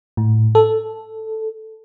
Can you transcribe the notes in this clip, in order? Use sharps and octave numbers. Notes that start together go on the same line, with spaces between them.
A2
A4